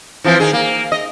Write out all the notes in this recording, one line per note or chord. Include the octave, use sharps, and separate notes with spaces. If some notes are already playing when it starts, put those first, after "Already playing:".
E3 F3 C4
D#3 G#4
A#3
D#5